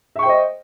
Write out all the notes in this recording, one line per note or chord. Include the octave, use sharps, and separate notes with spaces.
C5 D#5 E5 G5 C#6